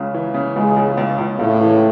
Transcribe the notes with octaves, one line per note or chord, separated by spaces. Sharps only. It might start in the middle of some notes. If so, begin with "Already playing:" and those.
Already playing: C#2 C#3
E3
C#3
C#2 G#3
C#2
C#2
C#2
C#2 A2
E3